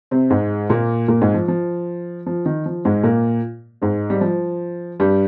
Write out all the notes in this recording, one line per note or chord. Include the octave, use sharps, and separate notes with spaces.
C3 C4
G#2 G#3
A#2 A#3
A#2 A#3
G#2 G#3
F3
F3
F3
D#3
F3
G#2 G#3
A#2 A#3
G#2 G#3
G3
F3
G2 G3